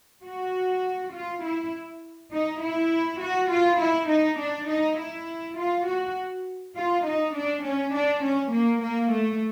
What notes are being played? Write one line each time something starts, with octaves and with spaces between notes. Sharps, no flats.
F#4
F4
E4
D#4
E4
F#4
F4
E4
D#4
D4
D#4
E4
F4
F#4
F4
D#4
D4
C#4
D4
C#4
A#3
A#3
A3